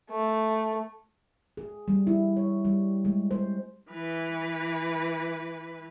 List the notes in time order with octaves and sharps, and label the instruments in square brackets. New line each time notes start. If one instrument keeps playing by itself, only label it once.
[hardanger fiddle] A3
[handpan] G#4
G3
E4
C#5
G3
G#3
C5
[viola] E3 B4